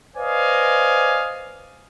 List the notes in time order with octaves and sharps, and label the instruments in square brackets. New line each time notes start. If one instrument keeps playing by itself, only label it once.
[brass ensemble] B4 C5 D5 D#5 F5 G#5